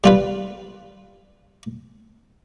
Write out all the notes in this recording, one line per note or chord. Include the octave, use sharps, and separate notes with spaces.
G3 F4 B4